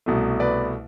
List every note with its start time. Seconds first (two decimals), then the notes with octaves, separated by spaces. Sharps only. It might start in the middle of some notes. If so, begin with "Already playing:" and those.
0.06 C2 B2 A3
0.40 B4 D5